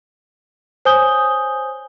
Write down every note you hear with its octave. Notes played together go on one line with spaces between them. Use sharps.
C5 C#5 G#5 D#6 G6 G7